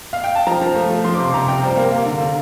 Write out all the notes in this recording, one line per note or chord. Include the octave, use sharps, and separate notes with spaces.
F5
G5
A5
F3 A#5
F3
A3
F3
F3 C6
D6
C3 C6
C3 A#5
C3 G5
G3 C5
A#3 A#4
A#3
D3
D3